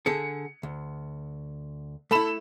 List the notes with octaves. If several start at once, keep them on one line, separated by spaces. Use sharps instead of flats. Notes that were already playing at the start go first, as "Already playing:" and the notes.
D3 G#4 A4 C#7
D2
A3 E4 A4 B5 E7